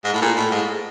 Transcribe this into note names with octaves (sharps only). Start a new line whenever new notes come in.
G#2
A2
A#2
A2
G#2